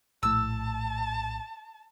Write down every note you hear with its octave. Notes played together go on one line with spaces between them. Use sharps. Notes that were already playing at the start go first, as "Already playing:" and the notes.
A#1 A2 A5 E6